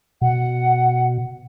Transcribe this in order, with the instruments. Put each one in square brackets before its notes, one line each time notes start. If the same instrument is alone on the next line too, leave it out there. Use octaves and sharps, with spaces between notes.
[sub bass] B2 [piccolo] F#5